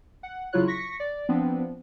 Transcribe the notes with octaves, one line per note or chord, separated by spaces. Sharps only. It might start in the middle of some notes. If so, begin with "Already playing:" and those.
F#5
C#3 F#3 E4 F4 C#5 F#6
C#6 A#6 B6 C#7
D5
F3 B3 C4 D4